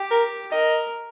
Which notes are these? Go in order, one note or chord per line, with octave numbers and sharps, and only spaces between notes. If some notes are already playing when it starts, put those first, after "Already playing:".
Already playing: G4
A#4
A#4 D#5